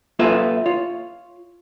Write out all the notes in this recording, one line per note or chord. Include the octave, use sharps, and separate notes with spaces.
A#3 F4 A4 B4 E5
F4 C#5